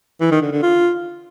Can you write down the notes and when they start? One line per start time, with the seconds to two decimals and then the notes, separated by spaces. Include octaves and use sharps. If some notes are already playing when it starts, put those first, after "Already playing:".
0.21 E3
0.31 D#3
0.42 D3
0.52 D3
0.63 F4